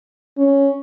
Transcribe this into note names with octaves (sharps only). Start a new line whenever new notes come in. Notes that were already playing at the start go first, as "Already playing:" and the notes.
C#4